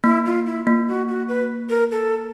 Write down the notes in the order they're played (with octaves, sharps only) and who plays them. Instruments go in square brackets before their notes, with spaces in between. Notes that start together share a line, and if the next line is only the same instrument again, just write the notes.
[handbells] A#3 [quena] E4
[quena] F4
E4
[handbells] A#3 [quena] F4
[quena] F#4
F#4
B4
A#4
A4